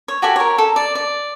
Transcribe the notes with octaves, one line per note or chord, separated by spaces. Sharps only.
C#5
F#4 G4 A4 G#5
A#4 C#5
A4
D5
D5